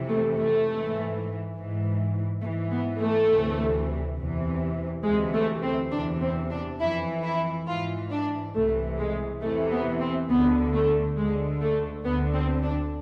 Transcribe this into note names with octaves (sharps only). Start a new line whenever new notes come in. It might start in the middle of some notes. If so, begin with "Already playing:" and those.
Already playing: F2 C3 E3
A3
A3
G#2 E3
G#2 E3
G#2 E3 A3
B3
A3
D2 C3 E3
E2 C3 E3
D2 C3 E3 G#3
A3
C4
E2 C3 E3 D4
C4
D4
F2 E3 E4
E4
G#2 E3 F4
D4
C2 C3 E3 A3
G#3
E2 C3 E3 A3
B3
C4
D2 D3 B3
A3
D2 D3 G#3
A3
D2 D3 B3
C4
D4